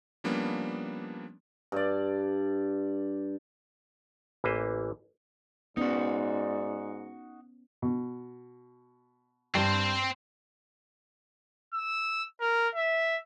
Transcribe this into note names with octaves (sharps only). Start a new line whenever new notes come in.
F3 G3 A#3 B3 C#4 D4
G2 D5
A1 E3 A#3 B4 C5
G#2 B3 C#4 D#4 F#4 D5
B2
G2 C4 C5
E6
A#4
E5